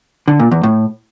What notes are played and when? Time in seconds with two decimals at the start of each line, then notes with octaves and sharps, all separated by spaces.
0.28 D3
0.40 A#2
0.51 E2
0.63 A2